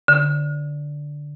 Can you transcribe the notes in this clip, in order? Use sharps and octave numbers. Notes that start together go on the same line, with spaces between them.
D3